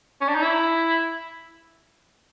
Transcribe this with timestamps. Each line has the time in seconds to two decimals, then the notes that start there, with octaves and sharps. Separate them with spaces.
0.21 C#4
0.28 D4
0.35 D#4
0.43 E4